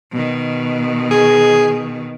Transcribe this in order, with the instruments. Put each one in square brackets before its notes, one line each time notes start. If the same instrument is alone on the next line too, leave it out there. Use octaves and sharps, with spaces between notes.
[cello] B2 D#3
[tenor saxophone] G#4